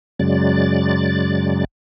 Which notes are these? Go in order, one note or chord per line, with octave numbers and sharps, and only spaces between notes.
F#2 C#3 F#3 G#3 D5 A6